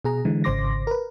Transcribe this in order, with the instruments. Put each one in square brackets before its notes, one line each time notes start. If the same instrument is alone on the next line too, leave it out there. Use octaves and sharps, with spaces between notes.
[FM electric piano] B2 G#4 A#5
D3 E3 G#3
G#1 C#3 C5 C6 D6 A#6
A#4 B4